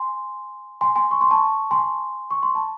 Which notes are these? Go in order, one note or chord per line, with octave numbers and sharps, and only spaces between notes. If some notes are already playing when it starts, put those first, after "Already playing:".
Already playing: G#5 C6
G#5 C6
G#5 C6
C#6
C6
A5 C#6
G#5 C6
C#6
C6
A5